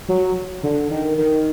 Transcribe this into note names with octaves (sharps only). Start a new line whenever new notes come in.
F#3
D3
D#3
D#3